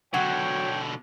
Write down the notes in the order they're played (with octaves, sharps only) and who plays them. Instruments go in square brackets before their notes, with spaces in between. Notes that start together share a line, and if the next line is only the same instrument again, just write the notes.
[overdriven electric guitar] B2 D3 [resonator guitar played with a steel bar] F#3 F#4 [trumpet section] C#5 G5